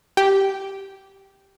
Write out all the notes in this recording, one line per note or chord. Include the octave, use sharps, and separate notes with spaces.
G4